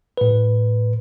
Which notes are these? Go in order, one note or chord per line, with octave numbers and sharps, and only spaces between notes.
A2 B4